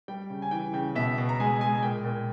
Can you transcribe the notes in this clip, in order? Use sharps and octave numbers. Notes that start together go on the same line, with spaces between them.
G3 G5
C#3
G#5
E3 G5
C#3 G5
B2 E5
B2
A#5
G#3 G#5
G#3 G#5
G#5
A#2 G5
A#2